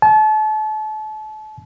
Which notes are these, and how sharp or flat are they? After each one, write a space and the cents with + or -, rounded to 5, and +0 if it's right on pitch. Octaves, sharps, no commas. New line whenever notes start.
A5 -35